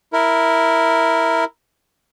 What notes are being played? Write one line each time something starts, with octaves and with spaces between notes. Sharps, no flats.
E4 A#4